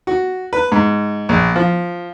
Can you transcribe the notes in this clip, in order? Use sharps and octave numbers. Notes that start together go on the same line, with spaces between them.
F#4
B4
G#2
A#1
F3